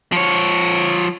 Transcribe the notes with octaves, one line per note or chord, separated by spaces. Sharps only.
F3 C#5